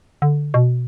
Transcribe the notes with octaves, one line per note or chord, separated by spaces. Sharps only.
D3
B2